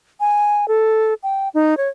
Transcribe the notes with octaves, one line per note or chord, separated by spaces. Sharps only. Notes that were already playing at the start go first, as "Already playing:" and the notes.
G#5
A4
G5
D#4
C#5